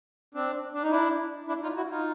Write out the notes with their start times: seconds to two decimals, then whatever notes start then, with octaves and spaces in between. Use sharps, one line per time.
0.34 C4 D4
0.74 D4
0.83 D#4
0.91 D4 E4
1.48 D4 E4
1.63 D#4 F4
1.77 E4 F#4
1.91 D#4 F4